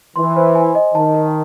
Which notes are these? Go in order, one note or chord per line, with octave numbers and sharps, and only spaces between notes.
E3 C6
C5
G#5
D#5
D#3 A5
A#4